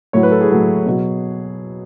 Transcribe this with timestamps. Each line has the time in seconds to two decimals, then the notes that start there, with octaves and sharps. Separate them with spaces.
0.13 A2 F#3 C#5
0.23 B4
0.31 A4
0.41 G#4
0.50 A2 F#3
0.86 B2 F#3